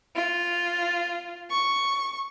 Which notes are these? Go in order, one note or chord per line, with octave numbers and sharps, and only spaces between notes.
F4
C#6